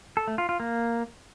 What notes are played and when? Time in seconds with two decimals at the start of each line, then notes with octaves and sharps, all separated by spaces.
0.17 A4
0.28 A3
0.38 F4
0.49 F4
0.60 A#3